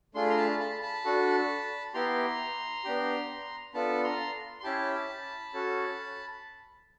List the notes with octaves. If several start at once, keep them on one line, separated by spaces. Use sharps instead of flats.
A3 D4 F4 G#4 C6
B5
A#5 C6
A5 B5
A5 B5
A5 B5
D4 F#4 A4
B3 E4 G4 A#5 C6
B3 D4 G4
B3 D4 F4 A4 A5 B5
A#5 C6
C6
C#4 E4 G4 A5 B5
C#4 F#4 A4